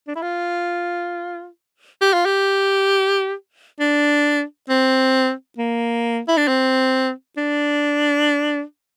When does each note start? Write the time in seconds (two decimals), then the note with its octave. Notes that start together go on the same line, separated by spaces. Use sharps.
0.07 D4
0.15 E4
0.22 F4
2.01 G4
2.13 F4
2.25 G4
3.80 D4
4.69 C4
5.58 A#3
6.28 E4
6.37 D4
6.48 C4
7.37 D4